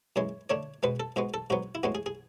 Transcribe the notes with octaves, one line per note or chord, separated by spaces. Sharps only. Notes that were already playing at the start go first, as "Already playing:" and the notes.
F#2 E3 G#3 C#5
D3 A3 D4 C#5
B2 G#3 B3 B4
A4
G#2 G#3 B3 F#4
A4
G#2 F#3 B3 F#4
E4
A2 G#3 B3 F#4
G#4
G#4